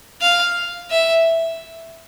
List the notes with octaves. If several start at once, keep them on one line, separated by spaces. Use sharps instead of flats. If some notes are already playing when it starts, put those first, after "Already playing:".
F5
E5